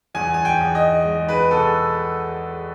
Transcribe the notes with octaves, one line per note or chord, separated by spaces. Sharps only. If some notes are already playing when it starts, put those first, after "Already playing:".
E2 G#5
G#5
G5
E2
D#5
G#3
B4
B2 A4